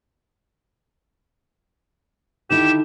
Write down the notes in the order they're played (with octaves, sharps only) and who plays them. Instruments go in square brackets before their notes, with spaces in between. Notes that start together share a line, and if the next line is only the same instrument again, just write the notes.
[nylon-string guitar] D3 D#3 E4 [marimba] D#4 [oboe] G4 [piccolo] E7